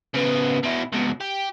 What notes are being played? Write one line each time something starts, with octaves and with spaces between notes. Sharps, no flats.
C#3 B3
B2 E4
C#2 B2
G4